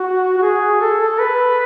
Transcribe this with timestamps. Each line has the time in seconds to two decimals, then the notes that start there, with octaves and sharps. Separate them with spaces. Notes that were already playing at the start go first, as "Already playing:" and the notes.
Already playing: F#4
0.38 F#4
0.42 G#4
0.81 A4
1.00 A4
1.19 B4